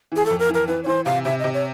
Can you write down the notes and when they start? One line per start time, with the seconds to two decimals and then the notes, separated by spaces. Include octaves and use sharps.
0.12 E3 G#4
0.26 F2 A4
0.39 A#4
0.49 E3
0.54 A#4
0.68 E3 B4
0.84 C#5
0.86 E3 C5
1.05 C3 F5
1.25 C3 E5
1.39 C3 D#5
1.54 C#5